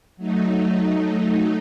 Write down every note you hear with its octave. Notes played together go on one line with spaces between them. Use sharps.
F#3 A3 D#4